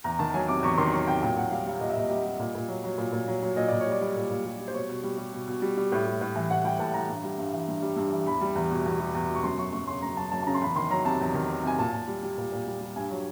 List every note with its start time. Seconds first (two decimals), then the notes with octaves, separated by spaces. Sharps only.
0.04 E2 A#5
0.19 D#3 A5
0.34 F#3 G#5
0.48 C3 D6
0.63 E2 C#6
0.77 D#3 C6
0.92 F#3 C#6
1.07 C3 G5
1.22 A#2 G5
1.36 A#2 F#5
1.51 G3 F5
1.66 G3 F5
1.80 A#2 D#5
1.90 E5
1.96 A#2 D#5
2.09 G3
2.25 G3
2.39 A#2
2.55 A#2
2.68 F#3
2.84 F#3
2.98 A#2
3.12 A#2
3.28 F#3
3.42 F#3
3.56 A#2 D#5
3.68 A#2 D5
3.80 C#5
3.87 G3 D5
4.01 G3
4.16 A#2
4.30 A#2
4.45 G3
4.60 G3
4.68 C5
4.74 B2 C#5
4.89 B2
5.03 G3
5.18 G3
5.33 B2
5.48 B2
5.62 G3
5.77 G3
5.92 A2
6.06 G3
6.21 A2
6.36 E3
6.50 A2 F#5
6.65 G3 G5
6.79 A2 A5
6.94 E3 A#5
7.09 G2
7.24 G3
7.38 G2
7.53 E3
7.68 G2
7.82 G3
7.96 G2
8.12 E3
8.26 E2 B5
8.41 G3
8.55 E2
8.71 B2
8.86 E2
9.00 G3
9.15 E2
9.28 B2
9.35 C#6
9.43 F#2 C6
9.58 F#3 C#6
9.73 F#2 C#6
9.87 C#3 C6
10.02 F#2 A#5
10.17 F#3 A5
10.32 F#2 A5
10.42 A5
10.46 C#3 A#5
10.54 C6
10.62 E2 B5
10.76 D#3 C6
10.90 F#3 A#5
11.05 C3 A5
11.20 E2
11.35 D#3
11.49 F#3
11.63 C3 G#5
11.78 A#2 A5
11.93 A#2
12.08 G3
12.23 G3
12.37 A#2
12.52 A#2
12.67 G3
12.81 G3
12.96 G2 G#5
13.10 F#3